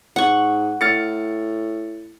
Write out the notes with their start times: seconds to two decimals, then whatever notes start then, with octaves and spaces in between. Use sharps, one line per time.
0.16 G#2 F#5 C#6
0.81 A2 F6 A6 C#7